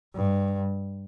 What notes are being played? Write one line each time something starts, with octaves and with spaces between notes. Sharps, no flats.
G2